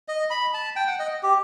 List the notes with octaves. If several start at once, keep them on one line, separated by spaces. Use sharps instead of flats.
D#5
B5
A5
G5
F#5
D#5
G4